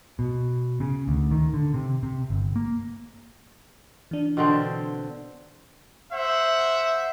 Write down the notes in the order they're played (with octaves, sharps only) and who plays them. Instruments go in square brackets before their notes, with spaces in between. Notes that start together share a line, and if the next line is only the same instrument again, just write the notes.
[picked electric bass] B2
C#3
D2
D#3
D3
C3
C3
G1
A#3
[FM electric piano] E3 D4
[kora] B2 D3 C4
[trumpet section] C5 E5 F#5